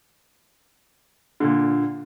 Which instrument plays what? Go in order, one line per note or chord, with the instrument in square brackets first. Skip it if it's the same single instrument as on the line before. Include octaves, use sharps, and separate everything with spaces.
[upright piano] A#2 D3